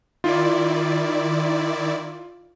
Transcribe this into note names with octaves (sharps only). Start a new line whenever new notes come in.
D#3 E4 F4 D5